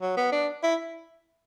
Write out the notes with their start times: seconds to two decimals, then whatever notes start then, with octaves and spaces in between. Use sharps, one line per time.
0.02 F#3
0.17 B3
0.32 D4
0.63 E4